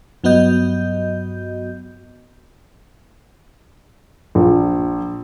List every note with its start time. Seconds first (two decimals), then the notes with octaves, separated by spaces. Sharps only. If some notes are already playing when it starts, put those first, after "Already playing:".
0.24 G2 F#3 B3 F#4 D#5 G6
4.35 A#1